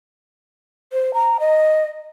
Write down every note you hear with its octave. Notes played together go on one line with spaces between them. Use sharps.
C5
A#5
D#5